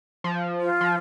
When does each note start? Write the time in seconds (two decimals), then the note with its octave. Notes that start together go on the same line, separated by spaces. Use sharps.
0.24 F3
0.61 F4
0.81 F3